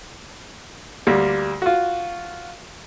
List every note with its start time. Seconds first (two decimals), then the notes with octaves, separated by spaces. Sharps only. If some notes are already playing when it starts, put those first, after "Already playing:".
1.07 D2 G3 A#3
1.62 F4 F#4